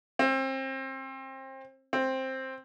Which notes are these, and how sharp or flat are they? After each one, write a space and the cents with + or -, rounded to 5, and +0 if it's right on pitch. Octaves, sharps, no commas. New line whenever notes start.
C4 +30
C4 +10